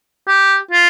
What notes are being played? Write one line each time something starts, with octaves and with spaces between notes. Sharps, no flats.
G4
F4